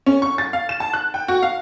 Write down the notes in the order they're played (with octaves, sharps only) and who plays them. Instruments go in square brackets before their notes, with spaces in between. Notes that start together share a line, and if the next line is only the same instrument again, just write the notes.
[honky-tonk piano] C#4
C#6
A6
F5
E7
A5
F#6
G5
F#4
F5